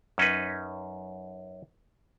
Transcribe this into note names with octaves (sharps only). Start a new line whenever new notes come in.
F#2 C#4 D#4 B4